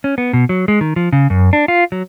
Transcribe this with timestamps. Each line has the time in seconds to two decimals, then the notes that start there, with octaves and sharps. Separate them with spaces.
0.04 C#4
0.18 B3
0.33 B2
0.49 F#3
0.68 G#3
0.81 D#3
0.96 F3
1.13 C#3
1.30 F#2
1.53 D4
1.68 F4
1.92 F#3